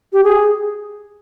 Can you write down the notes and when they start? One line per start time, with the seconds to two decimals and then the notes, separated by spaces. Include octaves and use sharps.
0.13 G4
0.24 G#4